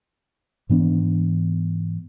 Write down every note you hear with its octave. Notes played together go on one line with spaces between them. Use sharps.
G#2 E3 B3 D4